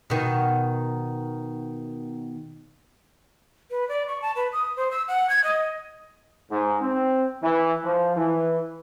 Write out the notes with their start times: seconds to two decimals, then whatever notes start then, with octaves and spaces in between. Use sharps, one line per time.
0.10 B2 D#3
3.71 B4
3.89 D5
4.08 C#6
4.22 A5
4.36 B4
4.53 D#6
4.77 C5
4.91 E6
5.08 F#5
5.29 G#6
5.44 D#5
6.50 G#2
6.81 C4
7.43 E3
7.84 F3
8.16 E3